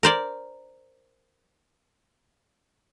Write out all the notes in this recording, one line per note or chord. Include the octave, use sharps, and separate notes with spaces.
A#4 C5 D5